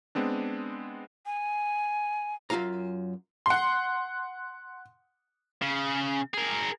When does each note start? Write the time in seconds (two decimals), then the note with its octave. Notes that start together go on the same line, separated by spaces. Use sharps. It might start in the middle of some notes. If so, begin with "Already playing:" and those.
0.15 G#3 B3 C4 D4
1.26 G#5
2.50 F#2 E3 F4 F5 A#5
3.46 F#5 C6
5.62 C#3
6.34 G#4 A#4